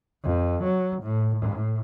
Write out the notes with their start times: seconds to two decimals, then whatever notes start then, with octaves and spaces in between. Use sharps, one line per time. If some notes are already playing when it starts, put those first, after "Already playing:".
0.24 F2
0.64 F#3
1.03 A2
1.36 A2